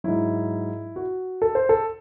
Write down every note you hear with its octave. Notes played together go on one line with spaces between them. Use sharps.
G#2 F#3 E4
F#4
A4
C5
A4